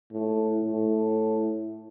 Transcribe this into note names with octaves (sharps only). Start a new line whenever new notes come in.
A2
A2